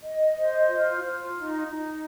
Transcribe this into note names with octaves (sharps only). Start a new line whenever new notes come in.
D#5
C5
F4
F4
D#4
D#4